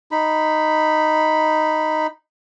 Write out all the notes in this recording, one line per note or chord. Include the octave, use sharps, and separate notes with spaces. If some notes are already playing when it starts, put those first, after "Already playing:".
D#4 B5